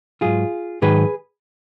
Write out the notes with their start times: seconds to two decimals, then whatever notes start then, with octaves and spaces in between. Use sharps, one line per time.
0.21 G#2 F#3 F4 G#4
0.82 G#2 D#3 F#3 G#4 B4